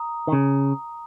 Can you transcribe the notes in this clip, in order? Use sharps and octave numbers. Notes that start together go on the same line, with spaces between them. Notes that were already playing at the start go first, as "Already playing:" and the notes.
Already playing: A#5 D#6
D#3
C#3